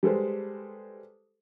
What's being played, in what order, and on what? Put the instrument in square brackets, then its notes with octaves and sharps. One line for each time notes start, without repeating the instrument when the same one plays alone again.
[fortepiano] G3 G#3 A4 B4 C5